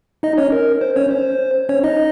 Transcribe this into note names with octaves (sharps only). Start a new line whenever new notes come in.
D#4 D#5
C#4 C#5
A#4
C5
C#4 C#5
C5
C#4 C#5
D#4 D#5